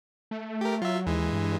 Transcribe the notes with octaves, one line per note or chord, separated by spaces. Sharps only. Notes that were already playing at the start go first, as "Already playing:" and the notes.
A3
G4 A#4
F#3 F4 E5
D#2 E3 G#3
G2